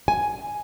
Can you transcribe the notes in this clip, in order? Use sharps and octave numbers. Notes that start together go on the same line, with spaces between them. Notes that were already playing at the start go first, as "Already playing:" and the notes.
G#5